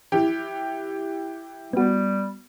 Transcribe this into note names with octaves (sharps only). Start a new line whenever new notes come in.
E3 G4
G3 B3 F#4